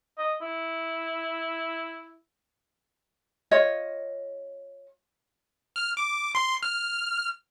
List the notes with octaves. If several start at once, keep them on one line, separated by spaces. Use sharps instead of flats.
D#5
E4
F4 C#5 D#5
F6
D6
C6
F6